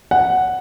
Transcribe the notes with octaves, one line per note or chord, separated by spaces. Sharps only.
F#5